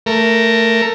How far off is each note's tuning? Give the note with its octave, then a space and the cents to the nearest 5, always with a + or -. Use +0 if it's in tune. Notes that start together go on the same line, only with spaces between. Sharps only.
A3 +15 A#4 +0